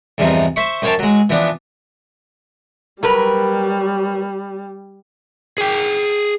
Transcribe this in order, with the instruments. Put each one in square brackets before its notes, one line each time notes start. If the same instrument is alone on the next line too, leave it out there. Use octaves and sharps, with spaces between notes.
[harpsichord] E2 G2 C3 F3 D#4
C5 E5 C#6
F#2 C5 C#5 F5 G5 A5
F#3 G#3
E3 F3 B3 D4
[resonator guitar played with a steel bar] F#3 A#4 B4 [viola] G3
[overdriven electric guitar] G#4 G5